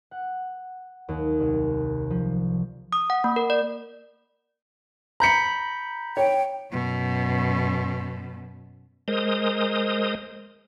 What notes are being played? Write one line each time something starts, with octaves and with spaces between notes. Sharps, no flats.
F#5
D#2
C2
F3
D#6
F#5
A#3
A#4
D5
A#5 B5 G6 B6 C#7
C#5 G5
F#2 B2
G#3 A#4 C5 D#6